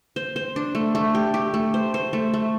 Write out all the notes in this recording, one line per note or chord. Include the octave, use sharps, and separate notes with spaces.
C5
C5
D4
A3
A3
G4
G4
A3
C5
C5
A3
A3